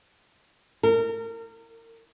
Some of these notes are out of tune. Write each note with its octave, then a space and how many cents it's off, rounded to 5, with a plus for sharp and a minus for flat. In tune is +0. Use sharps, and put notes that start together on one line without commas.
A#4 -30